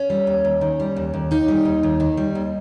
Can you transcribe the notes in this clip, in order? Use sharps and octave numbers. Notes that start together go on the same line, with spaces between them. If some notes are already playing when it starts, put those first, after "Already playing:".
Already playing: C#4
G3
D#2
D#2
D#3
G3
D#2
D#2
D#3 D#4
G3
D#2
D#2
D#3
G3
D#2